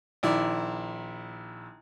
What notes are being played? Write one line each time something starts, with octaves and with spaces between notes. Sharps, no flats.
A#1 D#3 E4 D5